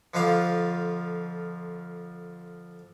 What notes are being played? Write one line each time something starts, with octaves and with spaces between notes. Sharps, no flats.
F2 D3 F3 D4 F4 F5